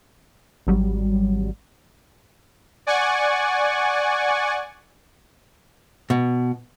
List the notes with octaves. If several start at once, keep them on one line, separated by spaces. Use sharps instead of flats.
G#1 F#3 G3
D5 F#5 G#5 C#6
B2